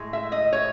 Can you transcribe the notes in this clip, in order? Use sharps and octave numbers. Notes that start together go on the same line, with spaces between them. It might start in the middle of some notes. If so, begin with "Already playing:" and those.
Already playing: A2 G#3
E5
D#5
C#5